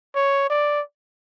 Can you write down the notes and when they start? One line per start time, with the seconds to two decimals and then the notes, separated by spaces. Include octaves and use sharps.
0.15 C#5
0.50 D5